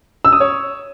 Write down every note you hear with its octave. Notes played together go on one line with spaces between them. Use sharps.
E6
D#6
C#5